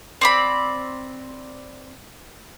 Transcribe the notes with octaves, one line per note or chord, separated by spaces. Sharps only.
C4 D5 B5